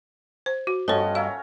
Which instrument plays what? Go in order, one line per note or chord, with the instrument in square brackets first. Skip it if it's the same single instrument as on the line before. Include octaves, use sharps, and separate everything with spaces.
[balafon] C5
F#4
[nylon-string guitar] G2 B3 D#5 [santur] F3 C#4 F#4 [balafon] A4 C#5
[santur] A#4 C#5 E5 [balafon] F5